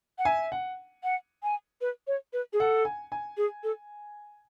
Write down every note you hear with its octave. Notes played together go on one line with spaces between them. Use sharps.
F#5
E5 G#5
F#5
F#5
G#5
B4
C#5
B4
G#4
A4 F#5
G#5
G#5
G#4
A4